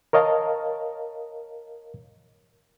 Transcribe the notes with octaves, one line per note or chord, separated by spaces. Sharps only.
A#4 C#5 D#5 F5 A5